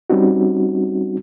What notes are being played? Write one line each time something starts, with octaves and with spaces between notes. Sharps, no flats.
G3 C4 C#4 D#4 F#4